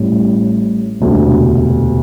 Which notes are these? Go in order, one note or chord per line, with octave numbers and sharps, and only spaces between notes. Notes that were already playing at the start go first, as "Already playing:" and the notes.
Already playing: A1 A2 G3
E1 D2 C3